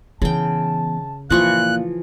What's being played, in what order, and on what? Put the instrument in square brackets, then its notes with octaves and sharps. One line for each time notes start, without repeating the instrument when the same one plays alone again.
[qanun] C#3 G5 [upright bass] E3 B3 [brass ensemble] A5
[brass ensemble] A#2 F5 [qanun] E3 F3 C#6 [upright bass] A#3 [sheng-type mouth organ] F#6